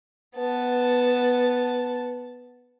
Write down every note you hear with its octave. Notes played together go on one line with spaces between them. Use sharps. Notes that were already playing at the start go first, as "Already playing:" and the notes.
B3 A5